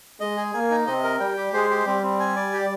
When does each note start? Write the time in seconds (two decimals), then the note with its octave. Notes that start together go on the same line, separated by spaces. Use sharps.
0.20 G#3 D#5
0.37 G#4
0.54 A#3 G#5
0.71 D#4
0.87 C3 D#5
1.04 A#4
1.20 G3 G5
1.37 G4
1.53 G#3 C5
1.70 G4
1.86 G3 C4
2.03 C4
2.20 G#5
2.36 D5
2.53 G4